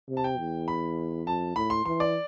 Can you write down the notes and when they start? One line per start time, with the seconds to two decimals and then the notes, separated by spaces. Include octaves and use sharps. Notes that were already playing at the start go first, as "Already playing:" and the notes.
0.09 C3
0.17 A5
0.24 G5
0.38 E2
0.68 B5
1.27 F2 A5
1.56 A2 B5
1.70 C6
1.85 E3 C6
2.00 D5